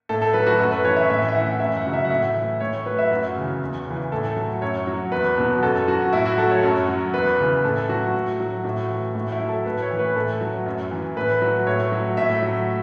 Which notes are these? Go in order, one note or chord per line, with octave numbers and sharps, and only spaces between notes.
A2 A4
A4
F#3 B4
F#4
F#2 A4
B4
E3 C#5
E5
A2 E5
E5
E3 F#5
F#2 E5
F#5
C#3 F#3
E5
F#5
A2 E5
E3
A2 C#5
F#3 B4
E5
F#2 F#4
C#3 E3
E2
C#3 E3
A2 A4
F#3
F#2 C#5
F#3
E2 B4
B2 F#3
F#2 A4
F#3 F#4
A2 E4
F#4
F#3 A4
C#5
F#2
F#3
E2 B4
C#3 E3
A2 A4
F#3 F#4
A2
F#3
A2 F#4
E3
A2 F#4
E4
F#3
A4
A2 B4
C#5
E3
B4
A2 A4
F#3
F#2
E3
A2 B4
F#3
A2 C#5
F#3
A2 E5
F#3